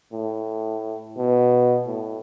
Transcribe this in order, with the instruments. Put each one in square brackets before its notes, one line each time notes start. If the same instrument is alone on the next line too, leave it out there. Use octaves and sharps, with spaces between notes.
[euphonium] A2
B2
A2